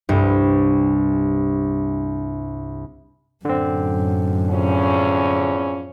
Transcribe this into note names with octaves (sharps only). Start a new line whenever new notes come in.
C2 G2
F#2 A2 D3 C4
E2 F3 C#4